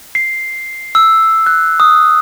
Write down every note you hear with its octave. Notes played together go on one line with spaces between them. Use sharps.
C7
E6
F#6
D#6